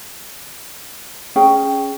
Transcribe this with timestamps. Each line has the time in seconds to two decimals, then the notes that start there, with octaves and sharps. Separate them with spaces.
1.36 C#4 G#4 G5